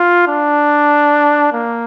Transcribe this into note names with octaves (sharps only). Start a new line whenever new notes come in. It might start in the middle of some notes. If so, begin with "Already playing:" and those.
Already playing: F4
D4
A#3